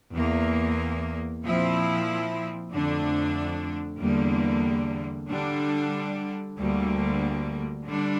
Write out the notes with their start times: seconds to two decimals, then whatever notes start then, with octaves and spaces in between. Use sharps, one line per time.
0.13 E2 E3 A#3
1.43 A#2 F3 C4 E4
2.71 F2 D3 A3 D4
4.00 E2 D3 G3 A#3
5.29 D3 G3 D4
6.58 D2 D3 G3 A#3
7.86 D3 G3 D4